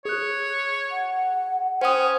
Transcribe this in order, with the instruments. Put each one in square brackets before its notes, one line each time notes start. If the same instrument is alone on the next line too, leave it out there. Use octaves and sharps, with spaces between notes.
[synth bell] G#4 F#6 [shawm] C#5
[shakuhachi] F#5
[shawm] C#4 [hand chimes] C5 D#6 [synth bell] G5